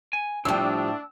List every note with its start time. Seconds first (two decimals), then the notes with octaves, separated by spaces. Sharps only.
0.13 G#5
0.45 A2 F3 G3 D4 G5 E6